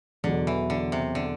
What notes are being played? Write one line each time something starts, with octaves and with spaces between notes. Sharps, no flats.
E2 B2 D3 F#3
E3
D3
C3
D3